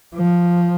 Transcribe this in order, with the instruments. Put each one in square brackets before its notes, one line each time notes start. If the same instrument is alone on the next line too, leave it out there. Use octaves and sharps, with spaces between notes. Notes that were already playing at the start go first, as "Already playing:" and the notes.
[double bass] F3